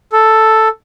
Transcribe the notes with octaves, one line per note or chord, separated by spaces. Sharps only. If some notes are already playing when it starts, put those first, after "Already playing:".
A4